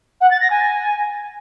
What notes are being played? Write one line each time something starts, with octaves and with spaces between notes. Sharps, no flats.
F#5
A6
A#6
G#5